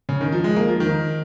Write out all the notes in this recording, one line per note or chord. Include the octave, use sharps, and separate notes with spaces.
C#3
D#3
F3
G#3
A#3
F3
D#3